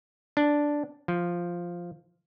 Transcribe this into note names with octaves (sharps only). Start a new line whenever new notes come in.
D4
F3